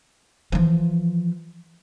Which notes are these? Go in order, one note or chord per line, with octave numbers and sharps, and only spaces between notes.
E3 F3